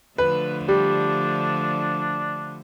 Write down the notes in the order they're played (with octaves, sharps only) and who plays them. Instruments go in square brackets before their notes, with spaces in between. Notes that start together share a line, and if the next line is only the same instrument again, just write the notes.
[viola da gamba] D3 F3 A3 [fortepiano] B4
[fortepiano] G3 [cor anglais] D4